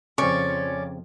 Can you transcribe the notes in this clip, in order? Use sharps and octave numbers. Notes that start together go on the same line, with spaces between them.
F2 C#3 F3 C4 C#4 D5 C#6